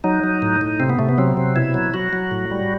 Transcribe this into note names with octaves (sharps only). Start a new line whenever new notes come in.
F#3 D#4
F#3
A2
A2
C3 C4
B3
C3 A3
B3
F#3 C4
C3
B2 E4
F#3
F#3 F#4
F#3
A2
G3